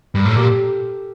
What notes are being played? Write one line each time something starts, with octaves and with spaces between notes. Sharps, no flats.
G2 A#4
A2 A4
A#2 G4